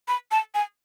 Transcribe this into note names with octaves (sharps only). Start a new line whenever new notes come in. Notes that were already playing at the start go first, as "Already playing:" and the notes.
B5
A5
G#5